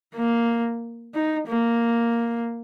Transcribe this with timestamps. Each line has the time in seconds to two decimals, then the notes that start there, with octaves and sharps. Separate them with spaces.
0.15 A#3
1.14 D#4
1.48 A#3